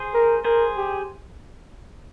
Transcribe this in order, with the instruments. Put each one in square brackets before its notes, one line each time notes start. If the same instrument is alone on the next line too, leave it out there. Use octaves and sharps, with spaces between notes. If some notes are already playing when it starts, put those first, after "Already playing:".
Already playing: [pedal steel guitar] G#4 C5
[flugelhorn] A#4
[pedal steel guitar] G#4 C5 [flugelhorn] A#4
[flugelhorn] G4